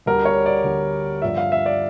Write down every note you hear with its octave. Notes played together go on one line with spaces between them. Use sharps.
D2 D3 G3 A#4
C#5
D5
D2 D3 G3
G2 D3 F3 E5
F5
E5
D5